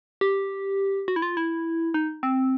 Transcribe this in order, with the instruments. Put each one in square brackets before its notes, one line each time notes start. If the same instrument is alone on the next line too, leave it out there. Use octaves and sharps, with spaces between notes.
[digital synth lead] G4
F#4
E4
F4
E4
D#4
C4